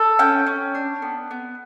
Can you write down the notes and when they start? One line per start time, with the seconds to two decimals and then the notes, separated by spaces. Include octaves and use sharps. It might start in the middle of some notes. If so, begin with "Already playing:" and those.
Already playing: A4
0.19 C#4 G5
0.47 C#4
0.75 D4
1.02 B3
1.31 B3